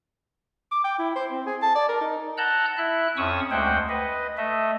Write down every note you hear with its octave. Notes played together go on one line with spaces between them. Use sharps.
D6
G5
E4
C5
C4
G#4
A5
D5
A#4
D#4
F#5 A5 A#5 E6 F#6 G6
E4 E5 F#6
F2 C#4 C#6 D#6 E6
D2 G#3 C5 F#5 G5
B4 D#5
A3 D#5 E5